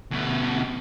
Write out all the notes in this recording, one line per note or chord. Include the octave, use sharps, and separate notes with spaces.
D2 B2